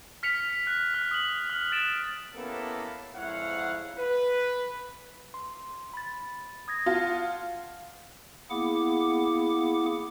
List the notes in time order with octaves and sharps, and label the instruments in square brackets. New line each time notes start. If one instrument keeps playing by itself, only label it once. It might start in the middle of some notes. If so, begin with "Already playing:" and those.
[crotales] F6 B6 C#7 F7
F#6
F6
D#6 F#7
F6
F#6 A6 D7 E7
[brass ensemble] A#3 B3 C#4 E4 G4 A4
F2 G#2 E4 C#5 F5 F#5
B4
[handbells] C6
B5 A6
D#6 G#6 A#6
[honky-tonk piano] F4 [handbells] F5 F#5 A5
[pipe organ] A#3 B3 E4 G#4 F#5 D6